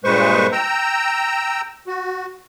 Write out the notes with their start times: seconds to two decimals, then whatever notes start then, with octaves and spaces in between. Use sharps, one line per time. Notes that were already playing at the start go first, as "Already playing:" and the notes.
0.04 G2 A#2 G#3 B4 C5 C#6
0.52 G5 A#5 E6
1.87 F#4